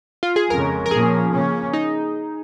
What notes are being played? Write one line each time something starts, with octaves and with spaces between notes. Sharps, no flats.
F4
G#4
F2 C#3 G#3 C#4 A#4
A#4
A#2 F3 A#3 C#4 G#4
C#3 A#3 C#4
D#4